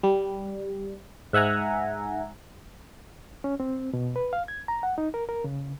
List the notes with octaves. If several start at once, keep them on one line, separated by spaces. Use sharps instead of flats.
G3
G#2 E5 F#5 G#5 A#5
C#4
C4
B2
B4
F5
G#6
A#5
F#5
D#4
A#4
A#4
C#3